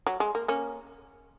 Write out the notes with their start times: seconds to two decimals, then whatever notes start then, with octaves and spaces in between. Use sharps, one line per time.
0.07 F#3
0.20 G#3
0.35 A#3
0.48 A#3 C#4